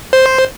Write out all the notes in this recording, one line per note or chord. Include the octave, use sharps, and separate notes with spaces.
C5